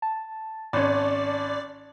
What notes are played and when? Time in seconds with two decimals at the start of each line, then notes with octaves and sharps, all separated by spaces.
0.02 A5
0.73 G#1 C#4 D5